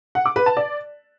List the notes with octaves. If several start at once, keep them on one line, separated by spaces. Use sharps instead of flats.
F#5
D6
B4
A5
D5